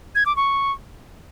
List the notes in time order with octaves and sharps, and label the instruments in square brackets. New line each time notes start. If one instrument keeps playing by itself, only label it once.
[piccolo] G#6
D6
C#6